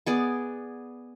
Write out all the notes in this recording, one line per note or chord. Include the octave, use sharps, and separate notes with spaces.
B3 G#4 D5